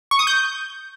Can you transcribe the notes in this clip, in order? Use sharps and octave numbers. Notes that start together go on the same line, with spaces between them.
C#6
D#6
G6